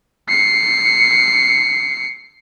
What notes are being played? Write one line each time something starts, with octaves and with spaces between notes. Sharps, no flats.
C7 C#7